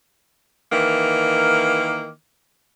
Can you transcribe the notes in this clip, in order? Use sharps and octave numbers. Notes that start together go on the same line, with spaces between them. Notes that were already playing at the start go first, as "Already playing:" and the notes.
D#3 E3 A#3